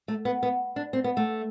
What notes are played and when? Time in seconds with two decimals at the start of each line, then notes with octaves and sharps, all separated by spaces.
0.08 A3
0.25 B3
0.43 B3
0.76 D4
0.93 C4
1.04 B3
1.17 A3